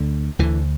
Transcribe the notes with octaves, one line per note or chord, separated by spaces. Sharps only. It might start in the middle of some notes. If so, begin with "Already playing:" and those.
Already playing: D2 D3
D2 D3 E3